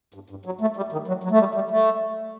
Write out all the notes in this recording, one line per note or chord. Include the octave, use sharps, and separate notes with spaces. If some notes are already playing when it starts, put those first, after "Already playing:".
G2
G2
F#3
A3
G3
D#3
F#3
F#3
A3
G3
G3
A3